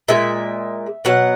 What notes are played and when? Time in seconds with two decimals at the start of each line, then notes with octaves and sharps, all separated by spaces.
0.08 A#2 G#3 E5
1.05 B2 F#3 F#5